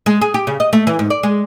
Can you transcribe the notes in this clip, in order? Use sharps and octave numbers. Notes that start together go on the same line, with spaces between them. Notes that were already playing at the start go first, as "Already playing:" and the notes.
G#3
G#4
G4
C#3
D#5
A3
E3
G#2
D5
G#3